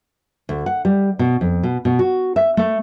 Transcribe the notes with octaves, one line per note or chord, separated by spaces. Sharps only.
D2
F#5
G3
B2
F2
B2
B2
F#4
E5
A3